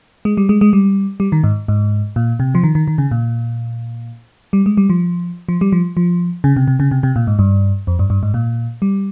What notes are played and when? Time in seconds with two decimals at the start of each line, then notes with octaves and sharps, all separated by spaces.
0.25 G#3
0.37 G3
0.49 G#3
0.61 G#3
0.73 G3
1.20 G3
1.32 D#3
1.44 G#2
1.68 G#2
2.16 A#2
2.40 C3
2.55 F3
2.64 D#3
2.75 D#3
2.88 D#3
2.98 C#3
3.11 A#2
4.53 G3
4.66 G#3
4.77 G3
4.90 F3
5.49 F3
5.61 G3
5.72 F3
5.97 F3
6.44 C#3
6.56 C3
6.68 C3
6.80 C#3
6.91 C3
7.03 C3
7.16 A#2
7.27 G#2
7.39 G2
7.87 F2
7.99 G2
8.10 G2
8.23 G#2
8.34 A#2
8.82 G3